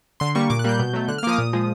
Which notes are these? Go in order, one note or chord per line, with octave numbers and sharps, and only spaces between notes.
D3 C6
G3 A#3 C#6
A#2 D6
F#6
G3 A#3 G6
B2
F#3 A3
D3 F#6
F6
F3 A#3 D6 D#6
A#2
F3 G#3